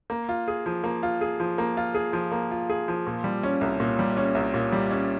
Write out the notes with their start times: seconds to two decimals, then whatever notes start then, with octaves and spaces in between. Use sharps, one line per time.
0.10 A#3
0.29 F4
0.48 G#4
0.66 F3
0.84 A#3
1.03 F4
1.21 G#4
1.40 F3
1.58 A#3
1.77 F4
1.95 G#4
2.13 F3
2.32 A#3
2.51 F4
2.70 G#4
2.88 F3
3.07 A#2
3.24 G3
3.43 C#4
3.61 C2
3.80 A#2
3.99 G3
4.17 C#4
4.35 C2
4.54 A#2
4.72 G3
4.90 C#4